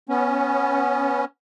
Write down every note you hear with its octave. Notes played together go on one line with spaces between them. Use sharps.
B3 C#4